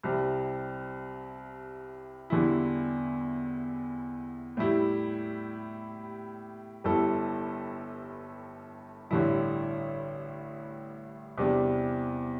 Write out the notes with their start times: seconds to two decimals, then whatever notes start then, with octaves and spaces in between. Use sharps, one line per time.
0.03 C2 C3 G3
2.30 E2 D3 G3 E4
4.57 A2 G3 E4 G4
6.84 G1 G2 G3 E4 A4
9.11 A1 G2 D3 G3 E4
11.38 E2 C3 G3 D4